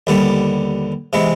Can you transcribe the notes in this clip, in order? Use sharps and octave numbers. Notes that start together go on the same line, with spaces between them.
D#2 D3 G3 B3
C3 E3 G#3 B3